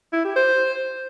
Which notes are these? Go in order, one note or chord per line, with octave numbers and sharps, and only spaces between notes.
E4
G4
C5